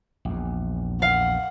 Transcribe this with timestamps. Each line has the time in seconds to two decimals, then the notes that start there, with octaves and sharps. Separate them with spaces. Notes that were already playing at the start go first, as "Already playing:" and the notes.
0.25 A#1 E2
1.02 F5 F#5